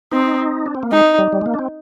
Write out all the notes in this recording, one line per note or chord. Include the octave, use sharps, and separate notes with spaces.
C4 D#4
D4
C4
A#3
G#3 D#4
G3
G3
G#3
A#3
D4
C4